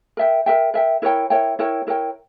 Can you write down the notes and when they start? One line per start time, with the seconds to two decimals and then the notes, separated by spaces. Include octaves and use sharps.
0.17 A#4 E5 G5
0.46 A#4 E5 G5
0.74 A#4 E5 G5
1.02 E4 A#4 C#5 G5
1.30 E4 A#4 C#5 G5
1.59 E4 A#4 C#5 G5
1.87 E4 A#4 C#5 G5